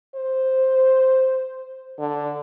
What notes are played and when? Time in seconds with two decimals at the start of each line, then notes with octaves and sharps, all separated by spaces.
0.15 C5
1.99 D3